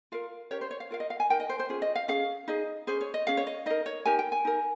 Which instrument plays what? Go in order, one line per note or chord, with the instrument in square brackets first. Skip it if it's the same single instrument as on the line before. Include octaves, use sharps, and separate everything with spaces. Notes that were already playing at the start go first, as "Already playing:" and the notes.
[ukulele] F4 A#4 F5
C#4 G4 A#4 C#5
C5
C#5
F5
F4 A#4 F5
D#5
F5
G#5
D#4 A#4 G5
D#5
C5
C5
C#4 F4 G#4
D#5
F5
C#4 G#4 F5
D#4 G#4 D#5
C#4 G#4 C5
C#5
D#5
C#4 G#4 F5
C#5
D#5
D#4 A#4 D#5
C#5
D#4 G4 A#4 G#5
G5
G#5
D#4 A#4